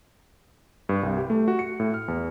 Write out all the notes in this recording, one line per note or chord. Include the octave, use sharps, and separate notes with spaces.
G2
C2
G4
A3
F#4
C#7
A2
F6
E2